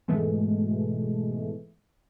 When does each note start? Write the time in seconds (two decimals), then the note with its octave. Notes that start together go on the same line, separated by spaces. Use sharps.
0.08 G#2 B2 E3 G#3 A3